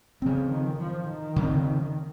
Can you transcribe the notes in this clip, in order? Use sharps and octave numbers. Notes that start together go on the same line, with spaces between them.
C#3 F3 C4
D#3
F3
D#3
C#3 F3 C4